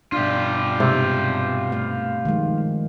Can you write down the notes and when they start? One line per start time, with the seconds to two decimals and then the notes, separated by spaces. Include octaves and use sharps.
0.12 G2 B2 D4 F4 G4
0.80 G#2 C3
1.70 A3 F5
2.25 D#3 F3 G#3